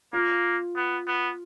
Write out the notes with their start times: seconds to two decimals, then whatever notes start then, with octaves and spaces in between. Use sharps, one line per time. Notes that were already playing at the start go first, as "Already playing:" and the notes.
0.13 A#3 F4
0.76 B3
1.07 B3